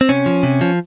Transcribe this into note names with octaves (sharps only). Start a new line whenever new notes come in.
C4
C3 C#4
F3
C3
F3